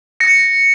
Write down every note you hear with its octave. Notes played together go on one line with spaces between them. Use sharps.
A#6 C#7